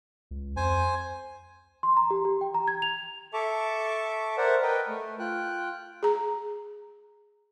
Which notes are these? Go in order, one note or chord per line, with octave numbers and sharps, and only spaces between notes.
C#2
F2 C5 G#5
C6
A#5
G4
G4
G5
A#5
G#6
F7
A4 E5 A5 C#6 D6
A#4 C5 D5 E5 F#5
A#4 B4 D#5 G5
A3
F4 G5 F#6
G#4 A#5